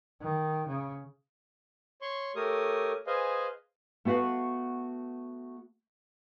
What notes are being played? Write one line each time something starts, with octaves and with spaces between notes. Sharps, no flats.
D#3
C#3
C#5 C6 C#6
A3 G4 A#4 C#5 D#6
G#4 B4 C5 D#5 F5 G#5
A3 B3 F#4 F5 F#5